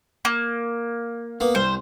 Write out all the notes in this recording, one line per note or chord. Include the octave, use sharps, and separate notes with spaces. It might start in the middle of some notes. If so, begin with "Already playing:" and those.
A#3
A#3 B3
C2 C5